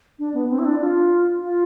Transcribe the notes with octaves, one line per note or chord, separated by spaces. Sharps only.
D4
B3
C4
E4
D4
F4
F4